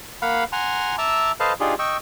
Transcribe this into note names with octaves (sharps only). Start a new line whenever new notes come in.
A#3 F5 F#5 B5
F#5 G#5 A#5 C6
E5 A5 A#5 D6 E6
A4 B4 C5 D#5 F5 A5
D4 D#4 F4 G4 G#4
D#5 G5 C#6 E6